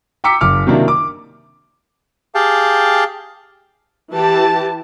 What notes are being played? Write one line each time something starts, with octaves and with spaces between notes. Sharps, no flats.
G5 A#5 D6 E6 B6 C#7
F#1 D6 F6
C3 D#3 F#3 A#3 D4 E4
D6
G4 G#4 F5 G5 A5
E3 G4 A5